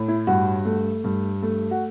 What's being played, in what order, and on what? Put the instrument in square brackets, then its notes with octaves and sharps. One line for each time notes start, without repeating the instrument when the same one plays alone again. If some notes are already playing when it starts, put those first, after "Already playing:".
Already playing: [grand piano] A2
E4
G2 F#4
A3
G2
A3
F#4